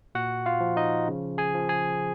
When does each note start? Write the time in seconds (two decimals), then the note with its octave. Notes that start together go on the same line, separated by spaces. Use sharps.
0.15 A#2 F#4 F#5
0.46 F4 F5
0.60 F3
0.77 D#4 D#5
1.08 C#3
1.38 G#4 G#5
1.54 F3
1.69 G#4 G#5